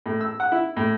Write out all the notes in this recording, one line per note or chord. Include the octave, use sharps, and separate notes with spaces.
A2
E6
F#5
E4
A2